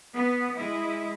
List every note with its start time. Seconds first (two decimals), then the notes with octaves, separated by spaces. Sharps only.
0.14 B3
0.54 G#3 E4